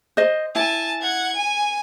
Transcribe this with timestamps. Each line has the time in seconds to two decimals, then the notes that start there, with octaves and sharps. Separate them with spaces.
0.17 C5 D#5
0.55 E4 G#5 A5
1.02 F#5 G#6
1.36 G#5